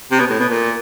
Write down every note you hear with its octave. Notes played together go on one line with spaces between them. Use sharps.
C3
B2
A2
B2
A#2